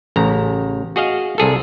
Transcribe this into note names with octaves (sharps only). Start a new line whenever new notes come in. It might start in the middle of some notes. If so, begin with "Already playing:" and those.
A1 C#3 A#5
F#4 G#4 D#5 F5
C2 G#4 A4